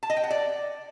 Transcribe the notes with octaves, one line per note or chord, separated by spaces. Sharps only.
A5
D#5
G5
F#5
D5